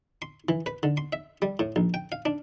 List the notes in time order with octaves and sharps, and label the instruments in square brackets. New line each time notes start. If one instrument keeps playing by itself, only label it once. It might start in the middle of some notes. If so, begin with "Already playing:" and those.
[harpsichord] C6
E3
B4
D3
C6
E5
G3
A2
A#1
G5
F5
D4